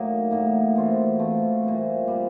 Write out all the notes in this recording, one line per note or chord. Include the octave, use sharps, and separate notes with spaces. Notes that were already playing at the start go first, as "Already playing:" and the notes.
Already playing: A2 F#3 A#3 D#4
A2 F#3 A#3 D#4
E3 A3 C4 F4
E3 A3 C4 F4
A#2 G3 C4
A#2 G3 C4